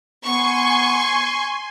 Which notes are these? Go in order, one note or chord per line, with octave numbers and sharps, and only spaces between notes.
B3 G#5 C6 C#6